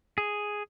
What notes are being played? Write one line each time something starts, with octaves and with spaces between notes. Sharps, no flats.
G#4